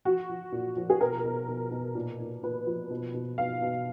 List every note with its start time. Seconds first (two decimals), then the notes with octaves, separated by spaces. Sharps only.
0.05 F3 F#4
0.29 F3
0.52 A#2
0.76 F3
0.90 G#4
1.01 B2 A#4
1.24 B2
1.48 B2
1.71 B2
1.95 A#2
2.20 A#2
2.43 A#2 B4
2.67 F3
2.90 B2
3.14 B2
3.38 B2 F5
3.62 B2